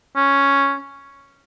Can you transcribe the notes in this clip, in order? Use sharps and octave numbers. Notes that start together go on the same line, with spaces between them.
C#4